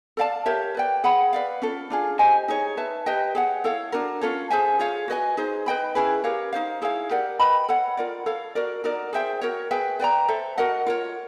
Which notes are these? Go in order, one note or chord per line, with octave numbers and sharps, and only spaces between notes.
A4 D5 F5 A5
G4 A#4 C#5 E5
B4 D5 G5
G#4 C#5 F#5 B5
B4 D5 F5
C#4 F4 A4
D4 F4 G#4
G4 C5 D#5 G#5
D#4 G#4 C#5
B4 E5 A5
G4 B4 D#5 G5
G#4 C#5 F#5
E4 A4 C#5 F5
D4 F#4 A#4
C#4 F4 A4 C#5
G#4 C5 E5 G#5
F4 G#4 C#5 F5
F#4 B4 D#5 G#5
D#4 G#4 C5
B4 D#5 G5 B5
C#4 E4 G#4 B4
G4 A#4 C#5 F5
D#4 G#4 C5 F5
E4 G#4 C#5 F5
G4 A#4 D5 F#5
B4 D#5 G5 B5
A4 C#5 F#5
F4 A#4 D5
A4 C#5 F5
F#4 A#4 D5
D#4 F#4 A#4 D5
G#4 C5 E5 G5
F#4 A#4 C#5
G#4 B4 E5 G5
B4 D5 G5 A#5
A4 C5 E5
F#4 A#4 D#5 F#5
F4 A#4 C#5